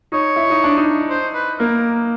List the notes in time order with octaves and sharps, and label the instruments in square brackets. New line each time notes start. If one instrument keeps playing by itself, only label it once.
[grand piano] D#4 [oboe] C#5
[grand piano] E4
D#4
D4
D#4
[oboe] C5
B4
[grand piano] A#3 [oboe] A#4